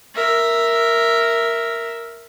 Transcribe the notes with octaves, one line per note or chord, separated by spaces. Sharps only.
A#4 E5